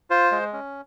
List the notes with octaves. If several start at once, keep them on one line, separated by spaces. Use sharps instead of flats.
F4 C5
G#3
C#4